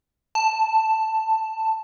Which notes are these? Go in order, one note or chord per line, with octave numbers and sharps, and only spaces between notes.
A5